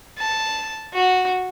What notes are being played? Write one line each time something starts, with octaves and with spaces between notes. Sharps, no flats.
A5
F#4